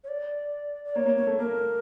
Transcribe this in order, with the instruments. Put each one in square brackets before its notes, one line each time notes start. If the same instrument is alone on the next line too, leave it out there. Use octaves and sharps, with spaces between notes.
[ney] C#5
D5
D5
[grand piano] A#3 [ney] C#5
[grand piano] A#3
[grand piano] A#3 [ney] C#5
[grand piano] A3
[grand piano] A#3 [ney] A#4